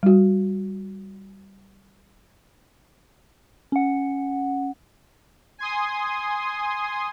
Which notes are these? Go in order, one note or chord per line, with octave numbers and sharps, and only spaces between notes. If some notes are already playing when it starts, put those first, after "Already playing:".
G3 F#4
C#4 F#5
G#5 C6 D#6